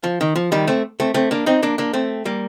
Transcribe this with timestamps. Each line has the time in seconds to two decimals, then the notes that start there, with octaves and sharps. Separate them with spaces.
0.04 F3
0.21 D#3
0.36 F3
0.52 D#3 G3
0.68 A3 C4
1.00 A3 C4
1.14 A3 C4
1.31 A#3 D4
1.46 C4 D#4
1.63 A#3 D4
1.78 A#3 D4
1.93 A3 C4
2.25 G3 A#3